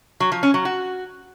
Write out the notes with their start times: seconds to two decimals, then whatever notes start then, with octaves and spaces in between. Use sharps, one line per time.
0.20 F#3
0.32 F3
0.43 C#4
0.54 F#3
0.65 F#4